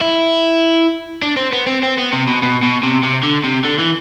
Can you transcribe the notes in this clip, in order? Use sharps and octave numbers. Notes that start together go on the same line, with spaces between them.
E4
D4
C4
B3
C4
C4
B3
C3
B2
B2
B2
C3
C3
D3
C3
D3
E3